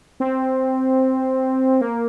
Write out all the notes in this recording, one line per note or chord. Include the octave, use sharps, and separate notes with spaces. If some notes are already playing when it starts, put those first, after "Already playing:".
C4
A#3